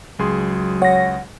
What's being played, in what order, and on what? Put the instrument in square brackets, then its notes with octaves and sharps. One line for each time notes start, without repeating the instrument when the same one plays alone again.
[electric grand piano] C#2 G#4 C6 [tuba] F#3
[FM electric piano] C#5 A#6 [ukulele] F#5